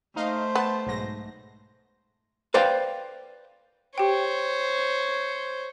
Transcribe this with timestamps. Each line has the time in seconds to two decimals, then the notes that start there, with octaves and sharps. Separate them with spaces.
0.16 A3 D#4 C5 D#5 F5
0.55 B3 A5
0.86 B1 G#2 A#6
2.54 B4 C5 D5 F5 G5
3.98 G4 C5 C#5 G5